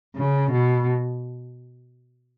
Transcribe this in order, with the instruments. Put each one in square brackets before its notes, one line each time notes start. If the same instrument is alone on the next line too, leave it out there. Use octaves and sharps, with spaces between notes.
[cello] C#3
B2